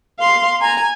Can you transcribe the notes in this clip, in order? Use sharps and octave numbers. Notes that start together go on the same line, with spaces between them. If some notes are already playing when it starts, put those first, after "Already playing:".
F5 C6
G#5 A#5